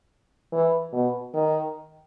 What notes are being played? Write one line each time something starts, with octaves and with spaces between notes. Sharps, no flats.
E3
B2
D#3